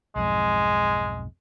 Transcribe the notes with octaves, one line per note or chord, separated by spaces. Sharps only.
B1 F2 G#2 G#3